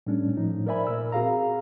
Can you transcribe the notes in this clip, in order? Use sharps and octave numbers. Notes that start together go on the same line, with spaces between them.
A2 G3 C#4 D4
A2 F3 D#4
A#4 C5 D5 E5 G#5 B5
A#2 A#4 E6
C4 F#4 G#4 F5 A#5